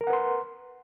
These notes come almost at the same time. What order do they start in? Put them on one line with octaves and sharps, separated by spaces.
A#4 A#5 F#5 B4 C6